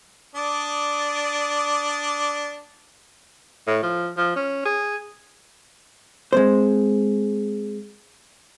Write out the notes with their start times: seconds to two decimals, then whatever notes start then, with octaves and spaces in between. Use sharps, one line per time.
0.35 D4 D5 D#6
3.67 A2
3.82 F3
4.17 F3
4.36 C#4
4.65 G#4
6.33 G#3 C4 C5